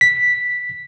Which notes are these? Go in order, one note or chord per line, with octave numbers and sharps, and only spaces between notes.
B6